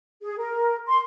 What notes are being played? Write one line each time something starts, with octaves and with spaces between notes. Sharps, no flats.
G#4
A#4
C6